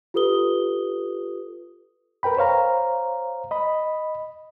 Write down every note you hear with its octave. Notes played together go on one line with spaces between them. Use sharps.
F4 G4 A4 B4 D#6 G7
A#4 B4 G5 B5
C5 C#5 F5 A#5
D#5 B5